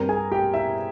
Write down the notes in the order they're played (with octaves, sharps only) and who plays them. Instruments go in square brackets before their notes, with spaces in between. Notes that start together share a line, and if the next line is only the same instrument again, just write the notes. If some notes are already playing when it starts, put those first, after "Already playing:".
Already playing: [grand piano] G2 G3 C4 A#4 A#5
G#4 G#5
G4 G5
E4 E5